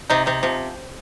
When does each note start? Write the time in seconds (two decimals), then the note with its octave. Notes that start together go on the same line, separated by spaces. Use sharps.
0.10 C3 D#4
0.26 C3 D#4
0.43 C3 F3